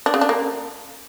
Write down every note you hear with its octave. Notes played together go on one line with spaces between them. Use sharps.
D4
C#3
D4
A#3